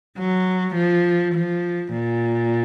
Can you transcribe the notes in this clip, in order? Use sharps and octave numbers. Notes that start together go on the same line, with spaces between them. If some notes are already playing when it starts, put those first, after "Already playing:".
F#3
F3
F3
A#2